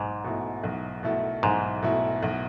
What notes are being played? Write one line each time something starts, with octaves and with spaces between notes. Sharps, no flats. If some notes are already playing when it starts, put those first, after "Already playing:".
Already playing: B1 G#2
B2 A3 E4
B1
B2 A3 E4
B1 G#2
B2 A3 E4
B1